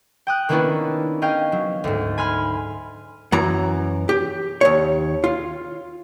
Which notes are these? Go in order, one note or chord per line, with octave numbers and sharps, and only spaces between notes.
G5 D#6 F#6
D#3 A#3 B3 C#4 D4 E4
C#4 G#4 D#5 F5 G5
F#3
D2 G#2
G#5 B5 C6 F6
F#2 E3 A#5
G4
D#2 C#5
F4